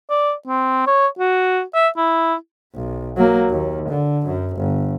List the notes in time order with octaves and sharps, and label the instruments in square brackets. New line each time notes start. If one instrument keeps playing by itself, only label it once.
[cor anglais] D5
C4
C#5
F#4
E5
E4
[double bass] B1
F#3 A#3
D#2
D3
F#2
G1